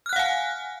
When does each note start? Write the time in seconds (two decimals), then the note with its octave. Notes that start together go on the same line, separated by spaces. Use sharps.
0.06 F6
0.09 F#6
0.13 F#5
0.16 F5
0.19 G#5